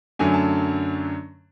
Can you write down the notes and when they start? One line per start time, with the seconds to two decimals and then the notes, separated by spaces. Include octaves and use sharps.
0.19 F#2 D3 F#3 A3 D4 G#5
0.34 A5